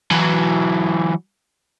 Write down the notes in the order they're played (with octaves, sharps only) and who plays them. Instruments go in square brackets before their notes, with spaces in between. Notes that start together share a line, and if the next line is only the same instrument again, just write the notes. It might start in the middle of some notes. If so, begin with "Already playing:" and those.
[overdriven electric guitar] E3 F#3